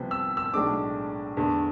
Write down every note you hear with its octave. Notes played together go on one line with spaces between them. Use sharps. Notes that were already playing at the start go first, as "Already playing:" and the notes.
Already playing: C2 C3 F3 B3
E6
E6
B1 A2 G#3 D4 D6
E2 D3 A3